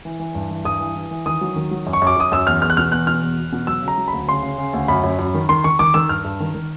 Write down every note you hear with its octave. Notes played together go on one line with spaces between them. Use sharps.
E3
E3
G2
E3
G2 D#6
E3
E3
E3
D#3 D#6
F#3
D#3
F#3
F#2
C#6
F#2 D6
F#2 D#6
F#2 E6
E2 F6
E2 F6
F#6
B2 F6
E2 F#6
B2 F6
E2
E2
B2
F#3 E6
C#3
A#5
F#3
B5
D2
C#3 C6
C#3
C#3
D2
F#2 B5
F#2
F#2
D#3
D#3 C6
D#3 C#6
D#3 D6
D#3 E6
G2 F6
G2
D#3
D#3